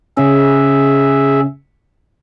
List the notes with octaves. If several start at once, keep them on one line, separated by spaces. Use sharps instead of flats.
C#3 C#4 G#4 E5